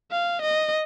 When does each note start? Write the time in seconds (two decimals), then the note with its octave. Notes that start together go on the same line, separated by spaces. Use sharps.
0.11 F5
0.42 D#5